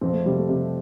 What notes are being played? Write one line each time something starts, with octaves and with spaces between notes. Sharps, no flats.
F2 C4
A3
C3 G3
A3
C3